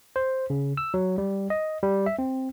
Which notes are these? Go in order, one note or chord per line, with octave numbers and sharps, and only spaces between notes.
C5
C#3
E6
F#3
G3
D#5
G3
E5
C4